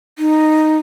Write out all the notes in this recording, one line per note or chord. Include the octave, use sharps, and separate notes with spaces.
D#4